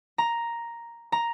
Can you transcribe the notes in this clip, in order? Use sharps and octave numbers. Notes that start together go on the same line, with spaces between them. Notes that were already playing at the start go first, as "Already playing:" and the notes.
A#5
A#5